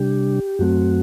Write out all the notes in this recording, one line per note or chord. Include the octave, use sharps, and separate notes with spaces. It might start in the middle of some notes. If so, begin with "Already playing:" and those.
Already playing: C3 G3 D4 G4
F#2 F#3 A3 C4 F#4